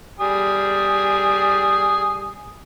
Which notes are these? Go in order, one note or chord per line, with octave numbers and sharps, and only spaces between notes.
G3 G#5 D#6